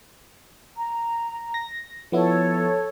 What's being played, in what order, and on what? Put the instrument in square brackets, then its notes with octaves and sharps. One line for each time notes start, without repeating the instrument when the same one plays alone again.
[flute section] A#5
[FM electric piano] A#6
[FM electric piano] F3 B3 E4 [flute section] A4 C#5